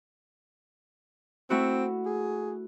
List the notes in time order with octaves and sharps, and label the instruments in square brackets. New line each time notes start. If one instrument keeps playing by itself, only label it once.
[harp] A3 E4 F#4 [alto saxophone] C4
[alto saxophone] G#4